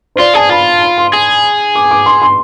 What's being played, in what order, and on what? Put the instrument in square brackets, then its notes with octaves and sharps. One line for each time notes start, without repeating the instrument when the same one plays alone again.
[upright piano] C5
[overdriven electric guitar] F4 [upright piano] D5
[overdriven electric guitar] G#4 [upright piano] A5
[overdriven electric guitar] F4 [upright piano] B5
[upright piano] B5
C6
[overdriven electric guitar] G#4
[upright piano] D6
D6
C6
C6